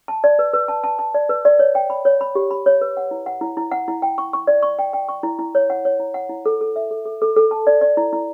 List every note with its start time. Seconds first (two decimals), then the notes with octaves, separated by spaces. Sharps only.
0.08 A5
0.24 D5
0.39 B4
0.53 B4
0.68 A5
0.84 A5
0.99 A5
1.14 D5
1.29 B4
1.45 D5
1.59 C#5
1.75 G5
1.90 B5
2.05 C#5
2.21 B5
2.35 G4
2.51 B5
2.66 C#5
2.81 B4
2.97 F#5
3.11 E4
3.26 F#5
3.41 E4
3.57 E4
3.72 F#5
3.88 E4
4.02 G5
4.18 C#6
4.33 C#6
4.47 D5
4.63 C#6
4.79 G5
4.93 G5
5.08 C#6
5.23 E4
5.39 E4
5.55 C#5
5.70 F#5
5.85 C#5
5.99 E4
6.14 F#5
6.29 E4
6.46 A4
6.61 A4
6.76 E5
6.91 A4
7.05 A4
7.22 A4
7.36 A4
7.51 A5
7.67 D5
7.81 D5
7.97 E4
8.13 E4